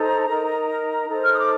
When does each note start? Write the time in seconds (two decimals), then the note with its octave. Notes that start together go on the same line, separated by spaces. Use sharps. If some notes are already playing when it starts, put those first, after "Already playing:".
Already playing: D#4 A4 C5 A#5
0.28 D#4 A#4
1.08 D#4 A4 C5 A#5
1.24 F6
1.32 D#6
1.40 D6